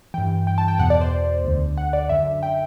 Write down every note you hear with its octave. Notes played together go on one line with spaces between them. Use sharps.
G2 E3 G5
G5
A5
G5
E2 B2 F#5
D5
C5
D2 D3
F#5
D5
F#2 D3 E5
G5